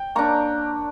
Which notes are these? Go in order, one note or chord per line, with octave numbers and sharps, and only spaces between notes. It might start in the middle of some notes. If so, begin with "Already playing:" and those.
Already playing: G5
A#3 D4 A#5 C#6